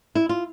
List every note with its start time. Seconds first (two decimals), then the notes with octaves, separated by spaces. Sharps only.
0.15 E4
0.29 F4